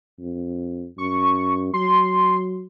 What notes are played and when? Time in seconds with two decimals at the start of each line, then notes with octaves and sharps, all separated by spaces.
0.20 F2
0.98 F#2 C#6
1.74 F#3 C6